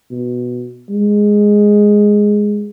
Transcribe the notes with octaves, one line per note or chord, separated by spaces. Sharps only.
B2
G#3